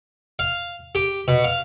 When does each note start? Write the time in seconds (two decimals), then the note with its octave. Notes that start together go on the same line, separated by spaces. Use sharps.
0.39 F5
0.95 G4
1.28 B2
1.44 F5